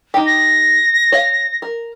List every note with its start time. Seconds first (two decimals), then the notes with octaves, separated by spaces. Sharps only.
0.14 D#4 G4
0.26 A#6
1.12 C#5 F5
1.62 A#4